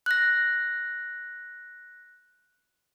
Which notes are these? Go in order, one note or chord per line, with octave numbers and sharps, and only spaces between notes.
F#6 A#6